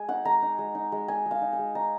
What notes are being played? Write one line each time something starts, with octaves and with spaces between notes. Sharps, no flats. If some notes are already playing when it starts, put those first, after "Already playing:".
Already playing: G#3 G#5
D#4 F#5
G#3 A#5
D#4
G#3
D#4
G#3
D#4 G#5
G#3
F5
D#4
G#5
G#3
D#4 A#5